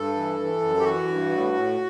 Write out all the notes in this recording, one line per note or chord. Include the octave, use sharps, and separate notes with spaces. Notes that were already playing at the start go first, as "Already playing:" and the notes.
Already playing: G2 A4
E3
E3
F#2
G4
E3 F#4
G2
A2
A2